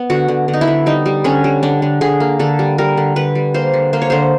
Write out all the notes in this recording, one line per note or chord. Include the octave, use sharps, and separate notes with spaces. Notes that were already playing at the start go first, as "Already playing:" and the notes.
Already playing: B3
D3 F#4
D3
D3
D#4
E4
D3
G3 D#4
G3
D3 C#4
G3
D3 D4
D3
D3 G#4
A#3
D3 A4
G3
G3 A#4
D3
D3 B4
G3
A#3 C5
D3
A#3 C5
C#5
D3 C5